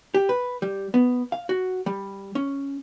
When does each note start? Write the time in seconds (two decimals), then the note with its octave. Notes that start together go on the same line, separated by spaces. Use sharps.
0.14 G4
0.29 B4
0.62 G3
0.94 B3
1.32 F5
1.49 F#4
1.86 G3
2.35 C#4